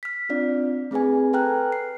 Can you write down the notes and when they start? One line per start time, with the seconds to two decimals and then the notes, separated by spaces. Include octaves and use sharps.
0.03 F6 B6
0.29 C4 D4 F4 D5
0.91 A3 C4 G#4 B4 G#5
1.33 A4 B4 G5 A#5 F6 F#6
1.72 C7